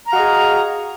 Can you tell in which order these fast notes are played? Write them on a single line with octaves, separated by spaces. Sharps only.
A#5 F5 F#4 D#5 G#4